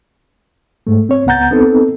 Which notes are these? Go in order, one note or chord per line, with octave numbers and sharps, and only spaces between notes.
G#2 A3
C4 C#5
C#2 B3 F#5 A#5 G6 A6
B3 C4 D#4 A4